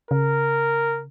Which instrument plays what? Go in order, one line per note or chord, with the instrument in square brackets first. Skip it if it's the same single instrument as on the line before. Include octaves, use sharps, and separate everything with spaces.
[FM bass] C#3 [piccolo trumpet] A#4